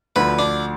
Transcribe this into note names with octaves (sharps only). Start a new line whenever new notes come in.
D2 D3 F3 B4
D4